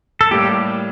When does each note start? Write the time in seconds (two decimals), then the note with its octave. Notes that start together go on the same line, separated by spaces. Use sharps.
0.21 A4
0.31 A2 G3 A#3 G4